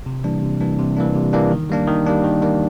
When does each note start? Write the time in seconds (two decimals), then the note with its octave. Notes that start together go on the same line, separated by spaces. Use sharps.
0.06 C3
0.24 E3 G3 A#3 D4
0.42 C3
0.60 E3 G3 A#3 D4
0.79 C3
0.97 E3 G3 A#3 D4
1.15 C3
1.33 E3 G3 A#3 D4
1.51 D#3
1.70 G3 A#3 D4
1.87 D#3
2.06 G3 A#3 D4
2.24 D#3
2.42 G3 A#3 D4